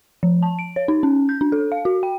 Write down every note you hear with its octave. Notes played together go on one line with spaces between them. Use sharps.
F3
A5
D7
C#5
D#4
C#4
G6
D4
A4
F5
F#4
G5